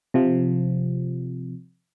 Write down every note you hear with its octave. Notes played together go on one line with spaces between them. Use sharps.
C3 F3